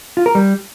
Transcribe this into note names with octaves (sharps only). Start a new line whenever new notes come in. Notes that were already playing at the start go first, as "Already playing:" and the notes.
F4
A#4
G3